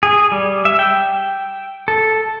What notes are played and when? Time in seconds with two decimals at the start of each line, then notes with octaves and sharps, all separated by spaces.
0.03 G#4
0.32 G3
0.65 E5
0.79 G5
1.88 A4